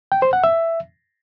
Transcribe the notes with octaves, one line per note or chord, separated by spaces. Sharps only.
G5
C5
F#5
E5